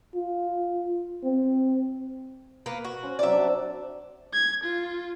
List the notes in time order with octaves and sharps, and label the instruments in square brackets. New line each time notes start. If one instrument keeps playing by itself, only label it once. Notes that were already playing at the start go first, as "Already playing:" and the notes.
[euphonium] F4
C4
[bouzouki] A#3 B3
F#4
[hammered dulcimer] C#4 C5
[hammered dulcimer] C3 F#3 [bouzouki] D5 E5
[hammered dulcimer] F#3 D4
[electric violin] G#6
F4